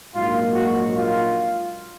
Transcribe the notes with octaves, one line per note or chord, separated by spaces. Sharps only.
A#1 G#2 F#3 A#3 D#4 F4
F#4
F4